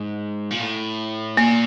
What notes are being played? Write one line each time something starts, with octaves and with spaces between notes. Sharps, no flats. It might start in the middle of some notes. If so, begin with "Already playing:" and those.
Already playing: G#2
A#2
A2
A#2 A#3